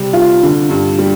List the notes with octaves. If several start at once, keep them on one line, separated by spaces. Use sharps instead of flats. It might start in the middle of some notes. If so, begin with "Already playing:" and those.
Already playing: C3 G3 C4
F4
D3
G2
G3